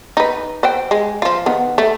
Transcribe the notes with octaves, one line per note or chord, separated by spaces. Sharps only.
D#4 B4
B4 C5 G5
G#3
F3 F4
D#3 B3
A3